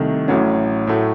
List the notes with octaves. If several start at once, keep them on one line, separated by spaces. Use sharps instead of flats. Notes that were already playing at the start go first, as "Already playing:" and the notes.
Already playing: C2 C3 D#3 A3
A1 A2 F#3 C#4
A2 F#3 A3